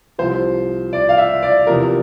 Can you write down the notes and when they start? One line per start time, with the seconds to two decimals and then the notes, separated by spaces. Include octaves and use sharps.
0.18 C2 C3 F3 C5
0.93 D5
1.09 F5
1.18 E5
1.43 D5
1.67 E2 C3 F3 A#4